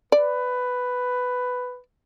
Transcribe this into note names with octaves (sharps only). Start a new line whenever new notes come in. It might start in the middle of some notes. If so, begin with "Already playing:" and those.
B4 D5